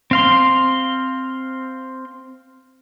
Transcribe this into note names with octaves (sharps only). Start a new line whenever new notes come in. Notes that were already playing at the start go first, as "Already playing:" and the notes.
C4 F5 C6